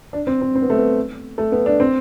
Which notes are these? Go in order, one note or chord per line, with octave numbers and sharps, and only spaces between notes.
D4
C4
C4
C4
B3
A3
B3
A3
B3
D4
C4